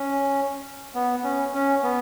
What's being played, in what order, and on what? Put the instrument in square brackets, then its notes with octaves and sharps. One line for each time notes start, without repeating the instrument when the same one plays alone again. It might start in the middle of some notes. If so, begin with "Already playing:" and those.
Already playing: [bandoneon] C#4
B3
C#4
C#4
B3